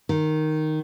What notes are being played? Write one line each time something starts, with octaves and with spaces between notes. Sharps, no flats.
D#3